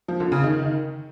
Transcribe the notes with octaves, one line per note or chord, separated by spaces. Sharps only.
F3
D3
C#3
D#3